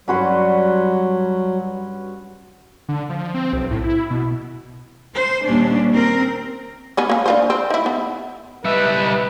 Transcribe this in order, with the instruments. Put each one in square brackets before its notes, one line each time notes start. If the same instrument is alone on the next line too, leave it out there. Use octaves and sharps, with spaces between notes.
[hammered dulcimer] G2 C6 [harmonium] F#3 [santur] C#4 F#4 B4
[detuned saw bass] D3
F3
C4
B1
A2
E4
B2
[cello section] C5
D#2 A#2 G3 C#4 D4
C4 A#4
[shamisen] B3 C#4 D#4
A#3 C#4
D4 F4 C5
C4
D#4 E4
B3
[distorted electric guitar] G3 E5 [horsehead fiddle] B4 D#5